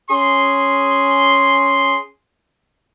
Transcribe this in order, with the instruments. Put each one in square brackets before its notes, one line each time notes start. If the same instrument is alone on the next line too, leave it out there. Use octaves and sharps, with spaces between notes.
[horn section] C#4 G#4 C6